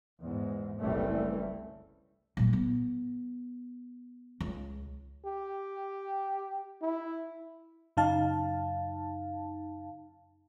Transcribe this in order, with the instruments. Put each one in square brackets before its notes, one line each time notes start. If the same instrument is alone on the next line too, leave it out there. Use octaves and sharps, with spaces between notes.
[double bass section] E2 G#2
F#1 C2 E3 G3 A3
[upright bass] A#2 F#3
B3
C#2
[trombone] G4
E4
[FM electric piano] F#2 C#3 D#4 F5 A5